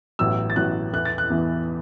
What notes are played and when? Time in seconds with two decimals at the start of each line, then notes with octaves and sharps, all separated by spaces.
0.19 A1 A2 F#3 B3 E6
0.50 A6
0.56 A1 A2 F#3 B3 F#6
0.93 E2 E3 B3 F#6
1.05 A6
1.18 F#6
1.30 E2 E3 B3